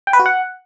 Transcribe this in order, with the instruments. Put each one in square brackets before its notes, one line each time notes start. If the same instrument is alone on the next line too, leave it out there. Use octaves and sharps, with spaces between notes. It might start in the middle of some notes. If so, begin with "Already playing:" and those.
[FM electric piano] G5
B4
F#4
F#5